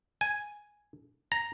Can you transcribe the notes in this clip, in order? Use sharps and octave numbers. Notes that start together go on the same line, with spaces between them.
G#5
A#5